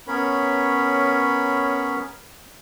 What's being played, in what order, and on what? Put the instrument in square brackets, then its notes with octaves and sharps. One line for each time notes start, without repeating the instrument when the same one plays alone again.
[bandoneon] B3 C#4 A#4 C#5 B5